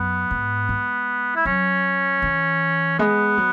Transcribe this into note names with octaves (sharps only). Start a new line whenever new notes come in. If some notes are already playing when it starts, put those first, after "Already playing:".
Already playing: F#2 B3
G#2
G#3
E4
F#3 C#4
E3
G#3 B3
F#3